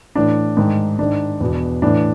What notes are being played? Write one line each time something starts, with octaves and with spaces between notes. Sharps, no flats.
A2 E3 D4
G#2 D#3
G#2 D#3 D4
E2 B2
A2 E3 D4